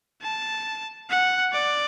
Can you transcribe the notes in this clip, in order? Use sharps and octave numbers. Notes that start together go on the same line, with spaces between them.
A5
F#5
D5